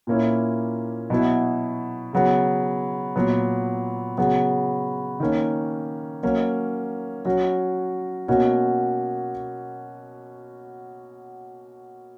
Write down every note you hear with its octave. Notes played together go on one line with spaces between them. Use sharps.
A#2 A#3 C#4 E4
B2 F#3 B3 E4
C#3 F#3 B3
A#2 F#3 B3
C#3 F#3 B3
D#3 A#3 C#4
F#3 A#3 C#4
F#3 C#4 F#4
B2 A#3 C#4 F#4